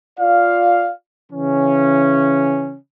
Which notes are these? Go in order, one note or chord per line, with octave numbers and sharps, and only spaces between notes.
F4 D5 F5
C#3 E3 C#4